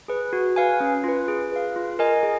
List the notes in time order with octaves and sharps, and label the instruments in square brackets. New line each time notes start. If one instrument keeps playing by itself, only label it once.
[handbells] G#4 B4
F#4
B4 F5 G#5
C#4
F4 B4
G#4
B4 F5
F4
A#4 D#5 G#5
G#4